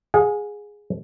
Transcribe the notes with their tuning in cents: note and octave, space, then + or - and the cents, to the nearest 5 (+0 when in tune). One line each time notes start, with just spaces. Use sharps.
G#4 +0 F#5 -45